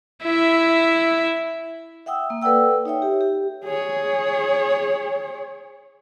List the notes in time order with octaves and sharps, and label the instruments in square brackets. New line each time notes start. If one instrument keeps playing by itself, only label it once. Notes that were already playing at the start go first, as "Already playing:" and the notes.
[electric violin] E4 E5
[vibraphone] E5 F#5 G5 D#6 E6
A#3
A4 B4 D5 F#5 G5 E6
D#4 C#5 E5 G5
G4
G4
[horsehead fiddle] G#4 C#5